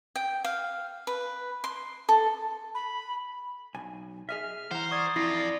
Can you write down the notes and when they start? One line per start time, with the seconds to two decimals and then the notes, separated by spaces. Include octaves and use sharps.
0.16 G5
0.44 F5
1.07 B4
1.64 C6
2.09 A4
2.74 B5
3.74 B1 G#5
4.29 G#4 D#5 E5 F6
4.71 E3 C5 F#5 A#5
4.91 D5 C#6 D#6 G#6
5.16 F2 E4 F4 A#6 C7